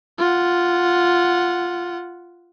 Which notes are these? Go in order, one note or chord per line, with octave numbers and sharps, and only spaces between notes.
F4 F#5